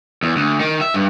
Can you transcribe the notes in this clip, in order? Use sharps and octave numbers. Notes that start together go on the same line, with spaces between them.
E2
D2
D#3
E5
G2